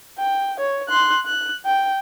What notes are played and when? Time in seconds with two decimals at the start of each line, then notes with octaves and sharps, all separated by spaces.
0.18 G5
0.60 C#5
0.89 C6 F#6
1.26 F#6
1.66 G5